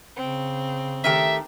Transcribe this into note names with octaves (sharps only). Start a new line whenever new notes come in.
C#3 C4
D#3 A3 G4 E5